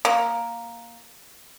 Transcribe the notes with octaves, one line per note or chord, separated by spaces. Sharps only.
A#3